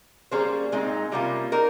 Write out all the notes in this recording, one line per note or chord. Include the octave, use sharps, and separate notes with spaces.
G3 A#3 C#4 G#4 C5
A#2 G#3 C4 D#4
C3 G3 A#3 C#4 F4
A#3 D#4 A#4